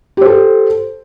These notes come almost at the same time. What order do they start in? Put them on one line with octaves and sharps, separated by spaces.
G4 C5 A4